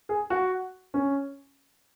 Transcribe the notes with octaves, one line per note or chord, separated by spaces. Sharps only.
G#4
F#4
C#4